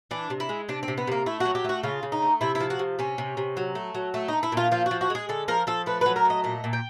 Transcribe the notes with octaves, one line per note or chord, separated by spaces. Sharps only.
E3 D4
C3
E4
G#3
C3 D4
C4
C3
B3
C3 A#3
A3 E4
F#3 F#4
G4
A3 F#4
C#3 F4
C#3
D#4
A3
C3 E4
E4
F3
F#4
C3
C3 C#4
C3
C3
F#3
A3
F#3
A3
A3 D#4
E4
A#2 F4
F3 F4
F#4
F3
F#4
G#3 G#4
D3 A4
F3 A#4
F3 A4
A3 B4
F#3 B4
A#4
A3 D#5
A#2 D#5
A#2
G5